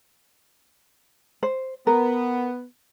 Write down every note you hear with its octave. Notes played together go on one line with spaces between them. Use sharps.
C5
B3 A#4